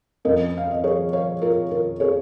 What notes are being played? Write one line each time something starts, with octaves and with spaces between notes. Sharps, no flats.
F2 F3 C#4 A#4 D#5
F5
D#5
G#4 C#5
C#5 F5
F4 A#4
F4 A#4
G#4 C#5